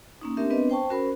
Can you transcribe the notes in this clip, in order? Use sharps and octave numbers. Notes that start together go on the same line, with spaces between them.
A#3 C#4 D#4
A3 C4 D4 G4 A#4 E5
B3 C4 D4 B4 D#5
C5 G5 A5 C#6
C#4 F#4 A#4 C5 B5